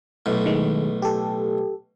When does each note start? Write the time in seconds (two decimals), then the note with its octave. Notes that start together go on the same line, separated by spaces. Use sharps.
0.26 B1 A2
0.46 D#3 G#3
1.02 G4 A4